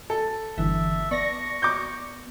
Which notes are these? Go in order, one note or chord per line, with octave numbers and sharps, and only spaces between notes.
A4
G1 E3 E5
B3 D5 C#6 A#6
D6 G6